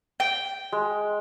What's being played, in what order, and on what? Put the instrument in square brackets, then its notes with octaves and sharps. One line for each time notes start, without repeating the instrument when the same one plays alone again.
[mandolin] G5
[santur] G#3